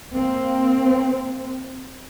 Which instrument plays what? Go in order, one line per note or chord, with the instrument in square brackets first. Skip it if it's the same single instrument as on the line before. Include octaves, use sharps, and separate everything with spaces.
[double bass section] A#3 C4